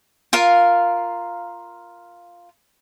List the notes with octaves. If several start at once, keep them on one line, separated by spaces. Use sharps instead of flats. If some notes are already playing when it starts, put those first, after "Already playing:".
F4 A#4 F5